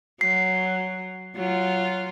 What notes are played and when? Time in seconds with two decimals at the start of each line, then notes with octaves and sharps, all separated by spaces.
0.21 F#3 C7
1.36 F#3 F4